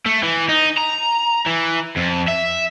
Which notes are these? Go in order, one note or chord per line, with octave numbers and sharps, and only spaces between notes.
A3
E3
D#4
A#5
E3
F2
E5